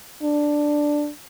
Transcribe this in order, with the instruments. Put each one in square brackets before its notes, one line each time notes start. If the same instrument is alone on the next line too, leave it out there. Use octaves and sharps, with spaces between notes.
[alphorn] D4